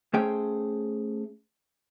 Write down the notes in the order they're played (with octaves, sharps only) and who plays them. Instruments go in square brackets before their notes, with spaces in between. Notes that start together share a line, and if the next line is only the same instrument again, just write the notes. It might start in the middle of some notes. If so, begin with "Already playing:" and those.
[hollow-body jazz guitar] A3 C#4 G#4 C5 G5